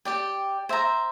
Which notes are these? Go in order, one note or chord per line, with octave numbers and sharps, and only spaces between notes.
G4 D5 G5
C5 E5 A#5